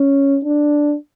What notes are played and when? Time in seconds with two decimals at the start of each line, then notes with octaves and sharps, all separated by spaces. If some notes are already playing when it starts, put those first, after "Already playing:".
Already playing: C#4
0.45 D4